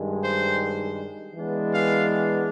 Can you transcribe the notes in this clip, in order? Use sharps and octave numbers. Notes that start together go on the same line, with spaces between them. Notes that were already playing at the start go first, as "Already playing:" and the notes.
Already playing: G2 D#3 G#3
C5
E3 G#3 B3 D4
F5